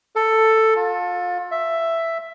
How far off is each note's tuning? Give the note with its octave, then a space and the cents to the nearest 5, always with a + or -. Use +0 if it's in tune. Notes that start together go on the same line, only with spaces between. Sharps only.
A4 +10
F4 +30
E5 +5